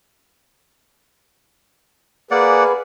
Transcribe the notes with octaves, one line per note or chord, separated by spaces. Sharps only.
A#3 G#4 B4 D5 F#5